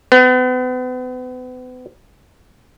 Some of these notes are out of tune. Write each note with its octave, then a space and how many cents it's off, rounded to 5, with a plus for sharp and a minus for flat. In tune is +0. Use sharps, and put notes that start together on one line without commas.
B3 +40